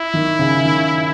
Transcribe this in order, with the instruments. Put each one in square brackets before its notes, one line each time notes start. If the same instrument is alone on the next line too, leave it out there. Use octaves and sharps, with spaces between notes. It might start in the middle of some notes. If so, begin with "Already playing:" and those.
Already playing: [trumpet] E4
[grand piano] D#3
C#3
D#3